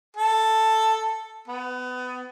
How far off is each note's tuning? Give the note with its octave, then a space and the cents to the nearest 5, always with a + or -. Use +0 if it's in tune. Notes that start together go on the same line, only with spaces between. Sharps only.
A4 +5
B3 +25